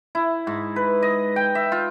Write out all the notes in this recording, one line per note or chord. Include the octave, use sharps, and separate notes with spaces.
E4
G#2
B4
D#5
G5
E5
F4